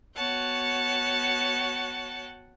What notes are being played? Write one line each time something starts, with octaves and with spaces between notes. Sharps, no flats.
B3 F#4 C#5 F#5 G5 A5